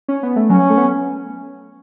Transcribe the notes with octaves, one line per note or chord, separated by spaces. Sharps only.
C#4
B3
A3
F#3 C#4
A3
B3